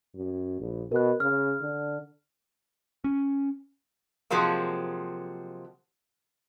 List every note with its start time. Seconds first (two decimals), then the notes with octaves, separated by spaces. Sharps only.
0.15 F#2
0.60 A#1
0.92 B2 A#4 F#6
1.20 C#3 F6
1.61 D3
3.04 C#4
4.30 C3 F3 F#3 G#3 A#3